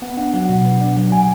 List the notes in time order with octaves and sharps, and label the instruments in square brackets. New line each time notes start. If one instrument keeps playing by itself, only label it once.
[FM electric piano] B3 [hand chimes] F#5
[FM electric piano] D4 [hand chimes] F#5
[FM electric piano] F#3 [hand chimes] F#5
[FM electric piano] B2
B3
D4
[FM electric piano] F#3 [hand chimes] F#5
[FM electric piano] B2 [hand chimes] G#5